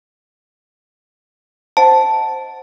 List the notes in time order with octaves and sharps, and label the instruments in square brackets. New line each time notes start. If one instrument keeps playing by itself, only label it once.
[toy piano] C5 D#5 F#5 [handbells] A5